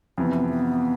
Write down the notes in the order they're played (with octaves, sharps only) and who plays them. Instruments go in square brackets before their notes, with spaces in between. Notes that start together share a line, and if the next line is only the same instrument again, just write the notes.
[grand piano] F2 C3 E3 [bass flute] B3
[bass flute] B3
B3